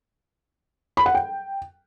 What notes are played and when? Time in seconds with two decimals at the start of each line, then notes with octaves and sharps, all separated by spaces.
0.97 B5
1.06 F#5
1.15 G5